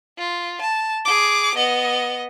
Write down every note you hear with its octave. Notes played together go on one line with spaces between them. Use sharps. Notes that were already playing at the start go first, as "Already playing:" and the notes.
F4
A5
G#4 D6
B3 D#5